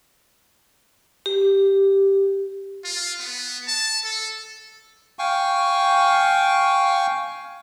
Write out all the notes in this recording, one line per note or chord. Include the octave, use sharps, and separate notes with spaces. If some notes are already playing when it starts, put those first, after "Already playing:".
G4
F4
B3
A5
A4
F5 G5 G#5 C#6